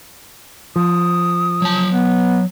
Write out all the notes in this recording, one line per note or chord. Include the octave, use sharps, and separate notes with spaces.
F3 D#6
F#3 A5
B3